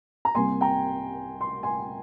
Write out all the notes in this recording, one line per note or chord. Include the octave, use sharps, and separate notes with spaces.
A#5
C2 C3 G3 A#3 G#5 C6
G5 A#5
C6
G#5 C6